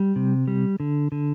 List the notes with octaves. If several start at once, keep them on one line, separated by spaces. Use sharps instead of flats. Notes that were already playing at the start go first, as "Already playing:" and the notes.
Already playing: G3
C3
G3
D3
D3